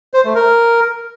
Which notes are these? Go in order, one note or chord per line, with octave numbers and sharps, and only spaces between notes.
C5
A3
A#4